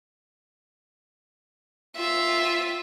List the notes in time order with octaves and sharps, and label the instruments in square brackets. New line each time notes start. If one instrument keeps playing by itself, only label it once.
[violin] F4 E5